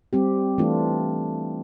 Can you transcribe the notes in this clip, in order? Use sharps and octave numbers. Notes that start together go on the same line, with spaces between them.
G3 C4 G4
E3 A3 D4 F4